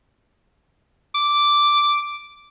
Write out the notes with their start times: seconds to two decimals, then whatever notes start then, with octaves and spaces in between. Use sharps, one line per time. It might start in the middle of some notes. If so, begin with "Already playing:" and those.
1.15 D6